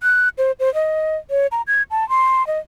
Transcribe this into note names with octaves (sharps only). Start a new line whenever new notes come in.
F#6
C5
C5
D#5
C#5
A#5
G#6
A5
C6
D#5